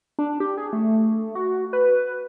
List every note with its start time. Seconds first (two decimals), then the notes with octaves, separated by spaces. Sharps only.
0.19 D4
0.40 G4
0.57 G#4
0.73 A3
1.35 F#4
1.73 B4